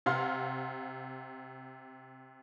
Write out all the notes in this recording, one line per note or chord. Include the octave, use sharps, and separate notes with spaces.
C3 F5 F#5 C6 F6